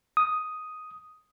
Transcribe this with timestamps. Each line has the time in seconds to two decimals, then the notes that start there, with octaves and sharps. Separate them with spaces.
0.17 D#6